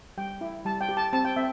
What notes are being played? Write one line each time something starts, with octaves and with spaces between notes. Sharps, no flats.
G3 G5
E4
G3 A5
G5
G4
A5
C4 A5
G5
C4 E5